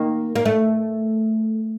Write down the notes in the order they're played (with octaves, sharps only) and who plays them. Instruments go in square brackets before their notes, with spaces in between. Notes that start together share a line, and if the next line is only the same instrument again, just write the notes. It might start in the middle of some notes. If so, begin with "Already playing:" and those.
Already playing: [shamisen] D#3 [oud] A#3
[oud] A#3
A3